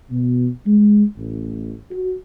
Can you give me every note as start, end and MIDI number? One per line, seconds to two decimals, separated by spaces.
0.10 0.48 47
0.66 1.03 56
1.17 1.73 33
1.91 2.14 66